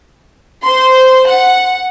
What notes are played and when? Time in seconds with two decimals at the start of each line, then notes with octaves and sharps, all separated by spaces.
0.64 C5 C6
1.27 F#5